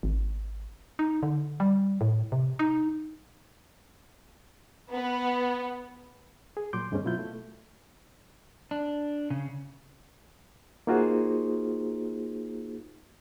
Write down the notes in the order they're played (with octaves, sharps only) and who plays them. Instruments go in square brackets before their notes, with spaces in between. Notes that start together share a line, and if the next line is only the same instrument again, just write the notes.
[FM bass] G#1
D#4
D3
G3
A2
C3
D#4
[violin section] B3
[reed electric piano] G#4
A#2 F#3 C6 D6 G6
D2 G2 G#3 A3 C4 C#4
B2 F#3 E4 F4 G6
A3
[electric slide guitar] D4
C#3
[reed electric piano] A#3 D#4 F4 F#4 G#4 C5